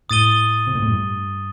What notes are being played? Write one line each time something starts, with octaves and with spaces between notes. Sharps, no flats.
A2 D#6 A6 D#7 G7
C3
A#2
A2
G2